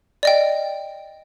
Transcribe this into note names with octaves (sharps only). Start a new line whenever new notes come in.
D5 D#5 G5